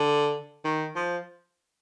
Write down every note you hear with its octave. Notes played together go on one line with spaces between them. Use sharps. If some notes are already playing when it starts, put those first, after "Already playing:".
Already playing: D3
D#3
F3